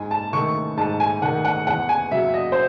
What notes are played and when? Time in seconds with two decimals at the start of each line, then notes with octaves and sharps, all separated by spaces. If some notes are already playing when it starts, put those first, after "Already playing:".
Already playing: G#2 G#5
0.11 A5
0.33 D#3 A3 C#6
0.77 G#2 A5
1.00 G#5
1.22 D#3 A3 F#5
1.45 F#5
1.67 E2 F#5
1.89 G#5
2.11 C#3 F#3 E5
2.34 D#5
2.52 C5